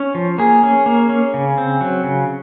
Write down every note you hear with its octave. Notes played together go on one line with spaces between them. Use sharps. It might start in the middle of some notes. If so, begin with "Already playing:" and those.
Already playing: C#4
F3
A#3 G#4
C#4
A#3
C#4
C#3
C4
F#3
C#3